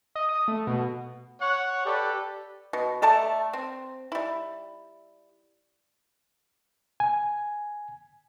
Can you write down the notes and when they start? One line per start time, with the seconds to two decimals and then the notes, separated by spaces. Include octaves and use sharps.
0.15 D#5
0.29 D#6
0.48 A3
0.67 B2
1.40 C#5 F#5 C#6
1.85 G4 A4 B4 D5
2.73 B2
3.02 A3 A4 D5 A5
3.53 C4
4.12 G3 E4
7.00 G#5